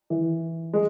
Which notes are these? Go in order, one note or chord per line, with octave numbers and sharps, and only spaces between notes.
E3
G#3